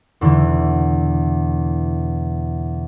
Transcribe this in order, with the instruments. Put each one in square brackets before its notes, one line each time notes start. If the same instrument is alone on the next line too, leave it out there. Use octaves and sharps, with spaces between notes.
[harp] E2 B2 D3 E3